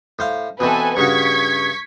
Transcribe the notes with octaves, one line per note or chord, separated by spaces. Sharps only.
A2 C5 F5
B2 E3 C4 A4 B4 G#5
G2 C#3 F#4 C#6 G#6 B6